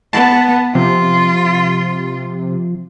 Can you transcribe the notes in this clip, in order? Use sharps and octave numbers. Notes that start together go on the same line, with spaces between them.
B3 A5
C3 F3 F4